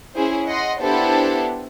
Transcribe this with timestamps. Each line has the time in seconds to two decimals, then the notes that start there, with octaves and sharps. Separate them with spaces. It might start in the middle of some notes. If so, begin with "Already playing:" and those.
0.15 C#4 E4 G#4 C5
0.47 D#5 F#5 C6
0.80 B3 D4 E4 G4 A4 C5